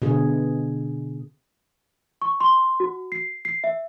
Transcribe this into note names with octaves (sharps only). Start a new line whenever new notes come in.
B2 D3 G#4
C#6
C6
F#4
C7
C7
E5